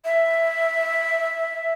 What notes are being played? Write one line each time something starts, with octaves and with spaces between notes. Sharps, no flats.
E5